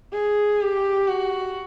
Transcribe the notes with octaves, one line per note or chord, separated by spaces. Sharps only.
G#4
G4
F#4